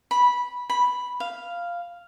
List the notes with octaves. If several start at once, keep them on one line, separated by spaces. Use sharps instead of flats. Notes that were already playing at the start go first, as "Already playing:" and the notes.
B5
B5
F5